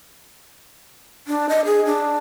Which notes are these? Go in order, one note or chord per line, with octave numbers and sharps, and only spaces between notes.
D4
D#5
G#4
D4